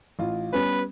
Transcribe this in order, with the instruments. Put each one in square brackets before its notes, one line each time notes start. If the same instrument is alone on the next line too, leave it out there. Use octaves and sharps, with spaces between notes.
[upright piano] A1 F4
[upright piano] G3 B3 C#4 [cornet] B4